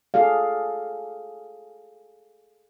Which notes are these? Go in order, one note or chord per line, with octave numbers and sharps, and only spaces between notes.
G#4 A4 D5 F5